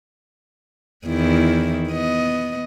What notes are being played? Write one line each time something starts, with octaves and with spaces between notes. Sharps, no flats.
E2 D#3 E4
B3 D#5